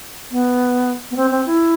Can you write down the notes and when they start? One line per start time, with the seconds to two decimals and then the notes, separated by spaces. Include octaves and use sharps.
0.31 B3
1.11 B3
1.16 C4
1.31 C4
1.46 E4